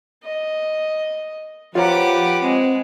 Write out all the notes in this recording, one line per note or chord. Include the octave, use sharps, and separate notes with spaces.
D#5
F3 F4 G4 B4 C#5 F#5 A#5 D6
G#3 C4